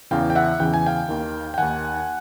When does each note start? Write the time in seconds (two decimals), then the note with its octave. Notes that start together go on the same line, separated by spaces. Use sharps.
0.11 E2 C#3 E3 F5 G5
0.30 G5
0.35 E5 F#5
0.60 E2 C#3 E3 G5
0.74 G#5
0.86 F5 G5
1.08 D#2 D#3
1.54 G5
1.58 D#2 D#3 F#5 G#5